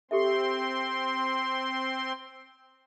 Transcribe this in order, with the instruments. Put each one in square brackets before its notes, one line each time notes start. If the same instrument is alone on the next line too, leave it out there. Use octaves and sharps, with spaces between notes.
[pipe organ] C4 C6 [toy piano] G4 A4 E5